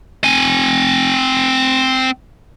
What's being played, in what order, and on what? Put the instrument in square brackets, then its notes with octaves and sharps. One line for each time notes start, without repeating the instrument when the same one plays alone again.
[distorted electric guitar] C4 G#5